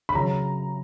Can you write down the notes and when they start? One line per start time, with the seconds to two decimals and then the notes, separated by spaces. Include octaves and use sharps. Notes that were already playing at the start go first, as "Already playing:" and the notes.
0.09 B5
0.15 C#3 F#3 A#5